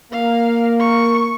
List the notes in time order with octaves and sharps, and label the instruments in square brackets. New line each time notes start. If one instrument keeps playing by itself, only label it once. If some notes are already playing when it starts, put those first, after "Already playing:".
[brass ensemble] A#3 [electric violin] F5
[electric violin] C#6